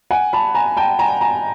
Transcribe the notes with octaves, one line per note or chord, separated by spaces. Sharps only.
F#5 G#5
A5 B5
G#5 A#5
G5 A5
G#5 A#5
G#5 A#5